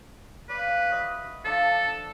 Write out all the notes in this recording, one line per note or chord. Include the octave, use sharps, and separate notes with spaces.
B4 D5 F5
D5
F#4 D#5 E5
F3 D4 A4